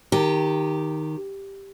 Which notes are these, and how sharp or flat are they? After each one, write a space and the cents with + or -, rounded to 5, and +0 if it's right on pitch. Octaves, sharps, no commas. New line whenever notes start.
D#3 +0 G4 +0 A5 +45